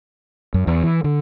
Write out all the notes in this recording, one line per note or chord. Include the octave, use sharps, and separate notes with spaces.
F#2
E2
E3
D3